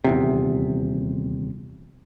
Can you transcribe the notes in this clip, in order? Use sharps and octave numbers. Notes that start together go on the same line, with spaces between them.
D#1 E2 C3